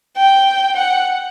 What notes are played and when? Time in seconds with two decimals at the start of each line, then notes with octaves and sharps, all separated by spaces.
0.17 G5
0.76 F#5